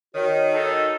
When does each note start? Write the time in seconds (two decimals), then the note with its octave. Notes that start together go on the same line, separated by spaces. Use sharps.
0.14 D#3 F#4 C#5
0.53 D#4 A4